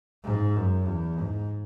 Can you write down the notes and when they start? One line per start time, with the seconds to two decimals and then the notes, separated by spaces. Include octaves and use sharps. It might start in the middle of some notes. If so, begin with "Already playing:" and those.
0.24 G#2
0.56 F#2
0.87 E2
1.19 G#2